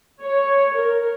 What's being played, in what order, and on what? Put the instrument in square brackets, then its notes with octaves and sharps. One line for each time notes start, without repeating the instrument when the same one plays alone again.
[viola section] C#5
A#4